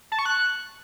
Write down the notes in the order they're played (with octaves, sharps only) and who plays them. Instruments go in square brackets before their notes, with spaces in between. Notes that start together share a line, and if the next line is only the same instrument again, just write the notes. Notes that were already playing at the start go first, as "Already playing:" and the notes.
[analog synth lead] A5
C#6
F#6